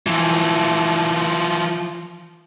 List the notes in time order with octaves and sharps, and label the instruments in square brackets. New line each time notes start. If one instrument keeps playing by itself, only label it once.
[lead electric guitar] E3 F3